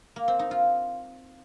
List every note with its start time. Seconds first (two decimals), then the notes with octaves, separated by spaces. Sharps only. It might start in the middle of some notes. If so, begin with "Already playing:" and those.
0.16 A#3
0.28 C4
0.39 D#4
0.51 F4